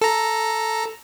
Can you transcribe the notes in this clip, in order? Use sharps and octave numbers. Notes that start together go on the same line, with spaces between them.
A4 A#5